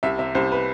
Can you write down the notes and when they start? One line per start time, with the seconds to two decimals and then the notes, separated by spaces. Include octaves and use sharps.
0.03 C2 E5
0.18 C3 E5
0.35 C2 C5
0.52 B4